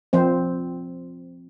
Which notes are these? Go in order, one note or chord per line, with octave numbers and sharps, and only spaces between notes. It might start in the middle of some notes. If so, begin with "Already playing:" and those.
F3 C4 C5